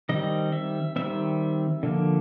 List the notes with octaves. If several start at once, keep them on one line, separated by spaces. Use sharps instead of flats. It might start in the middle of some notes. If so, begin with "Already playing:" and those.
D#3 G3 C4 D#5
E5
D#3 G3 C4 E5
D3 F3 A#3